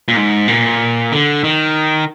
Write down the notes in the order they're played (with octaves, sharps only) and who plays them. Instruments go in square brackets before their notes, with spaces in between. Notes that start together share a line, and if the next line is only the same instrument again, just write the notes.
[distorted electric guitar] A#2
G#2
A#2
D3
D#3